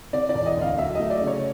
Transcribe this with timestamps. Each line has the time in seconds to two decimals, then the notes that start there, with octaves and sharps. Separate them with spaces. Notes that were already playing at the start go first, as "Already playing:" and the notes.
0.13 C3 D5
0.29 D5
0.35 E1
0.46 D#5
0.57 D2 F5
0.78 F#3 E5
0.95 A3 D#5
1.10 D5
1.21 C#3
1.27 C#5